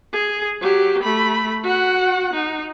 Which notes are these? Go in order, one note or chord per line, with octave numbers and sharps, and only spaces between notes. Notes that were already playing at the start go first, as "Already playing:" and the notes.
G#4
F#3 G4
A3 B5
F#4 F#5
D#4